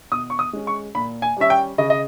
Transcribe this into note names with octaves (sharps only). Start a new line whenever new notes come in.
B2 D#6
C#6
D#6
G#3 C#4
C#6
A#2 B5
G#5
G3 C#4 E5
G5
C#3 D#5
D#5